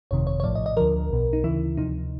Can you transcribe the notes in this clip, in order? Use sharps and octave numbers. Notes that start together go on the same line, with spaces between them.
G1 F2 C3 D#3 C#5
C#5
C#5
A#1 A2 F3 D5
D#5
D#5
D2 D3 F3 A#4
B1 B2
D#4
D2 C#3 E3 E4
D2 C3 F3 D#4